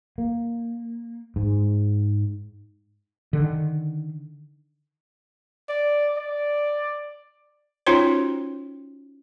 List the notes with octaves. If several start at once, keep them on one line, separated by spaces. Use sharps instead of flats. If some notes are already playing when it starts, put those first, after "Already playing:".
A#3
G#2
D3 D#3
D5
D5
C#4 D#4 F4 F#4 C5 C#5